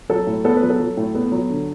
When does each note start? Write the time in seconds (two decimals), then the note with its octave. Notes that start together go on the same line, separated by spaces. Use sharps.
0.10 F#3 A4
0.27 A2
0.44 B3 A4
0.57 B4
0.62 F#3
0.70 A4
0.80 F#3
0.97 A2
1.15 B3 A4
1.32 F#3
1.50 D3